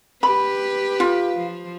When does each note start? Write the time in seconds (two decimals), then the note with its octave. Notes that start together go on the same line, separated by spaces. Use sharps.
0.23 G4 B4 B5
1.00 F4
1.37 F3